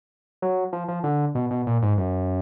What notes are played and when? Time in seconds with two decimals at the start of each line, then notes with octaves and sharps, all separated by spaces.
0.42 F#3
0.73 F3
0.88 F3
1.04 D3
1.35 B2
1.51 B2
1.67 A#2
1.82 G#2
1.97 F#2